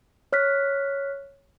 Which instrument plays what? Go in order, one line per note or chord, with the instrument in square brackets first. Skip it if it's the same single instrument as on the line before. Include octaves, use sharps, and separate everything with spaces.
[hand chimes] C#5 F6 F#6 B6